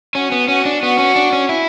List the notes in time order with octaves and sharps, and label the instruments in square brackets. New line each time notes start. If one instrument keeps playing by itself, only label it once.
[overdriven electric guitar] C#4 [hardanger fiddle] F#4
[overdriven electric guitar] B3
[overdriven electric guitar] C#4 [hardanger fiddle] F#4
[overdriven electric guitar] D4
[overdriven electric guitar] B3 [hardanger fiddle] F#4
[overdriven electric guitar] C#4
D4
C#4
E4